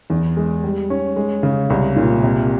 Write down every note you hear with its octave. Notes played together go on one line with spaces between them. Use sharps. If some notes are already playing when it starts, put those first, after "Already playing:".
E2
G#3
G3
C#4
G#3
C#3
C2
A#2
C3